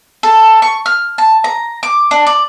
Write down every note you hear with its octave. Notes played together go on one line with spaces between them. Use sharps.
A4
C#6
F6
A5
A#5
D6
D4
D5